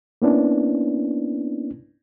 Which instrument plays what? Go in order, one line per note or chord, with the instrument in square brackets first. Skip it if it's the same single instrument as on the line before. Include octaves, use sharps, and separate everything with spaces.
[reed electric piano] A#3 B3 C#4 D4 E4